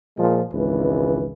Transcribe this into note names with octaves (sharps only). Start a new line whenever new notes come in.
A#2 F3 G#3
G#1 C#2 E3 B4